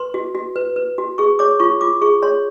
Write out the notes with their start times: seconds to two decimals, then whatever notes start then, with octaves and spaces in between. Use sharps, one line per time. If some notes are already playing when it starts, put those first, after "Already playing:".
Already playing: B4 C6
0.14 F#4
0.35 F#4
0.56 B4
0.76 B4
0.98 F#4
1.18 G#4 C#6
1.39 C#5 D6
1.60 F4 C#6
1.81 F4 D6
2.02 G#4 C#6
2.23 C#5 C6